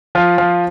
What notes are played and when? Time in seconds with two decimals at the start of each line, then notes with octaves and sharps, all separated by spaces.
0.15 F3 F4
0.38 F3